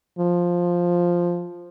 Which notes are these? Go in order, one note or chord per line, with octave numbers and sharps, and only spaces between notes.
F3